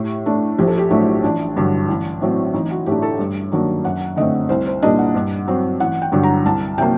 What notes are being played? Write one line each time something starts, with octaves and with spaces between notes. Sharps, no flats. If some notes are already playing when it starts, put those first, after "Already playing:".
Already playing: A2 G4
A3 D4
A#1 G4
A4
G4
A2 F#3 A3 D4
A1 D4
G2 D3 F#3
A1
A2 F#3 C4
A1 D#4
F#4
A2 A3 D4 G4
A4
G2
D#3 F#3 A#3 D4
F#2 F#5
D3 A3 C4 D#5
C2 C5
C5
A#2 G3 A#3 D4 D#5
F#5
G2
F#3 C4
A1 F#5
G5
G2 D3 F#3
A#5
C2 A5
C3 F#3 A#3 G5